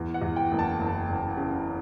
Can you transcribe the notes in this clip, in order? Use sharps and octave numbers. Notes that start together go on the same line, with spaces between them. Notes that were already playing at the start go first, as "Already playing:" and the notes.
Already playing: E2
F#5
E2
G5
F#1
A5
F#1
F#1
C#3